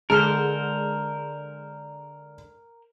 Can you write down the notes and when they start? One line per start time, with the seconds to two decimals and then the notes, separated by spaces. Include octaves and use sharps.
0.10 D3 G#3 A4 A#4 C5 F6